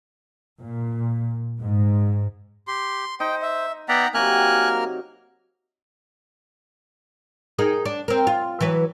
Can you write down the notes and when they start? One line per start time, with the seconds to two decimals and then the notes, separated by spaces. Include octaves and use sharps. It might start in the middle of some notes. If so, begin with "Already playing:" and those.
0.62 A#2
1.62 G#2
2.68 G4 C6
3.20 D#4 C5 G5
3.42 E5
3.89 B3 D5 E5 F#5 G5 A#5
4.14 C3 F#3 A#3 A#4 G#5 F6 F#6
7.59 D#4 G#4 A#4
7.86 D4
8.08 C4 A#4
8.27 F4
8.61 E3 F#3 B4